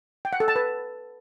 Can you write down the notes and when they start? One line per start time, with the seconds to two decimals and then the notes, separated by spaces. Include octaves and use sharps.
0.25 G5
0.33 F#5
0.40 A4
0.48 A5
0.56 B4